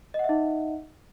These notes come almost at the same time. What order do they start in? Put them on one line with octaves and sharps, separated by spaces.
D#5 F#5 E5 D#4